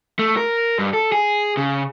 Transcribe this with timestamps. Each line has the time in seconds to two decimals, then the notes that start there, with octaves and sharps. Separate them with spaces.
0.19 A3
0.37 A#4
0.79 G2
0.94 A4
1.12 G#4
1.57 C#3